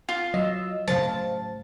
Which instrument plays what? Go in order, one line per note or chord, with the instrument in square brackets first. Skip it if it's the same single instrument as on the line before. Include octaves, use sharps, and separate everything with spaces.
[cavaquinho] F4
[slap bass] F#3 [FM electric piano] D#5 E6
[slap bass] A2 C#3 F#3 [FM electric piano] C5 F5 [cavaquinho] A5